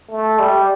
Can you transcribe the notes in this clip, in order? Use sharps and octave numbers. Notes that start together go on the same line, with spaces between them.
A3
G3